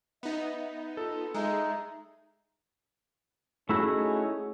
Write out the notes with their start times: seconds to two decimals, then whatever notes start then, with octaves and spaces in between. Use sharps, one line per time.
0.23 B3 D#4 E5
0.97 F4 A4
1.34 G#3 D#4 E5
3.69 A3 C#4 D#4 E4 F#4 G#4